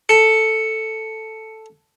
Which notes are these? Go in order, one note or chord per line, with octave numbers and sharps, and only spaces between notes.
A4 C#7